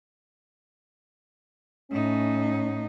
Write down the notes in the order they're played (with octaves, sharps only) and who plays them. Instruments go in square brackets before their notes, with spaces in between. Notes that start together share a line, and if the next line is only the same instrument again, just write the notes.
[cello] A2 D#4 [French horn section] C#4